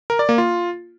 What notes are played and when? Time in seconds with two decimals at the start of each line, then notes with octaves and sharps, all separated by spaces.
0.10 A#4
0.19 D5
0.29 A#3
0.38 F4